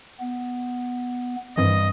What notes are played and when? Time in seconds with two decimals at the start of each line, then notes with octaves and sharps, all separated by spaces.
0.20 B3
1.57 G2 D#3 E3 C4 D#5